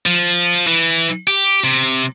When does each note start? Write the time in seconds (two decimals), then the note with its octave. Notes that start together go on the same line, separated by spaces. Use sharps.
0.06 F3
0.67 E3
1.27 G4
1.64 C3